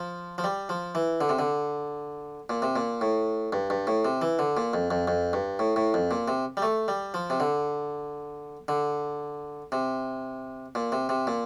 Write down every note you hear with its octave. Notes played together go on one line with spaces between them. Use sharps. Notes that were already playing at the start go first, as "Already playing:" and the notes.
Already playing: F3
F3
G3
F3
E3
D3
C3
D3
A#2
C3
A#2
A2
G2
G2
A2
C3
E3
D3
A#2
F2
F2
F2
G2
A2
A2
F2
A#2
C3
G3
A3
G3
F3
C3
D3
D3
C3
A#2
C3
C3
A#2